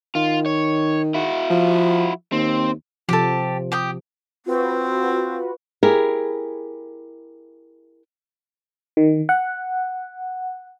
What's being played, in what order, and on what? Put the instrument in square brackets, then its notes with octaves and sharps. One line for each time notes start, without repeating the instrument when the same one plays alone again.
[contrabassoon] D#3 [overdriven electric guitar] F4
[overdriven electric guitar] C#5
E4 F#4
[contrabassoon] F3
[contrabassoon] D#2 [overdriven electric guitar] C4
[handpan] C3 F3 [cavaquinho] G4 A4
[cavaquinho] G4 G5 D#6
[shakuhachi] C4 [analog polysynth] F4 F#4 B4
[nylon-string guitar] E4 G4 G#4 A#4
[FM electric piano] D#3
F#5